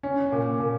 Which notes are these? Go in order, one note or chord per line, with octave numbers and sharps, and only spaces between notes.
C#4
A#2
A#2